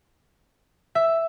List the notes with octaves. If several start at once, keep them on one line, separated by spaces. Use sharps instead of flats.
E5